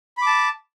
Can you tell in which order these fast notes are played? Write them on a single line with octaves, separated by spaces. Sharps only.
B5 D6 A5